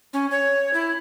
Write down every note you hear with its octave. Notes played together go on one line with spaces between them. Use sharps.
C#4
C#5
E4